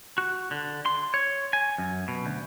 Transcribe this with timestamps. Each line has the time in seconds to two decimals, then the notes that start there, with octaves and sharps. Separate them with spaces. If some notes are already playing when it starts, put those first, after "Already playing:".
0.18 F#4
0.51 D3
0.86 C6
1.14 C#5
1.53 G#5
1.78 F#2
2.08 B2
2.26 D2